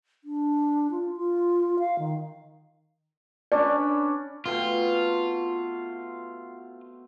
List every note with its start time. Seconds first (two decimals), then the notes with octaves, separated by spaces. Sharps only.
0.24 D4
0.91 F4
1.17 F4
1.79 F5
1.99 D#3
3.52 C#4 D4 B4 D5
4.46 B2 A3 C4 F4